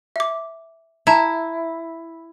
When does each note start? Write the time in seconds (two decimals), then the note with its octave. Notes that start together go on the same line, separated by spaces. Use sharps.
0.16 E5 D6
1.07 E4 A5 A#5